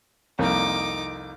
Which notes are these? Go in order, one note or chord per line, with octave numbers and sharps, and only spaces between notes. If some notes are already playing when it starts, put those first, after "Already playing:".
C2 F2 A#3 D#4 D6